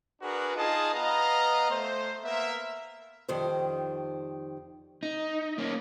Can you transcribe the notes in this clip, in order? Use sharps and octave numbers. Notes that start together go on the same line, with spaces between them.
D4 F#4 G#4 A#4 B4
D#4 F4 G#4 D#5 A5
B3 B4 D#5 F5 A#5
A3 C5
A#3 B3 A#4 E5
F2 D#3 G3 C5
D#4
A#3 C#4